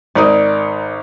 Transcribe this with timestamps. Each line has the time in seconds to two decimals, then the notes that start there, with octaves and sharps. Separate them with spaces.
0.15 G#1 D#4 A#4 D5 D#6